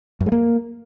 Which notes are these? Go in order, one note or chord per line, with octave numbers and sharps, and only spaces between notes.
F#2
G#3
A#3